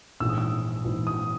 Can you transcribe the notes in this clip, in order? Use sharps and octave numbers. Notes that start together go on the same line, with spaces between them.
A#1 G#2 E3 E6
D#6
E6
A#1 G#2 E3
D#6